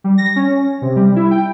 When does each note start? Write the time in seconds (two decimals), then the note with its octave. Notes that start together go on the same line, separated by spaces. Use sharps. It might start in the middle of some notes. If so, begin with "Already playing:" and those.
0.04 G3
0.18 A#6
0.36 C#4
0.82 C3
0.96 G3
1.16 E4
1.31 G5